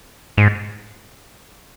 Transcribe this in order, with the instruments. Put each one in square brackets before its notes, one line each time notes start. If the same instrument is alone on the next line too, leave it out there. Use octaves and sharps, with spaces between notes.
[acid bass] G#2